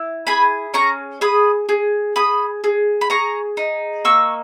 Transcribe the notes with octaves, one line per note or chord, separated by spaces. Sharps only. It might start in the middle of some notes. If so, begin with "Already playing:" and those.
Already playing: E4
G#4 G#5 B5
C#4 A#5 C#6
G#4 B5 D#6
G#4
G#4 B5 D#6
G#4
B5
G#4 A#5 C#6
D#4
A#3 C#6 E6